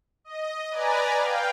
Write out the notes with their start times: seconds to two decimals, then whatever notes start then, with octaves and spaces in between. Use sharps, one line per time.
0.24 D#5
0.71 B4 D5 G#5 A#5
1.18 F5 G5